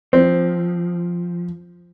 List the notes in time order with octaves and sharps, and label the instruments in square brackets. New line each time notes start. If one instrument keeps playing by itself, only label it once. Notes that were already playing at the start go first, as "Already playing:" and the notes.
[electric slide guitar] F3 [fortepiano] C4